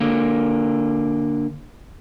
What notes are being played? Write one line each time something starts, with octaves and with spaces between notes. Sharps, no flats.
D3 A#3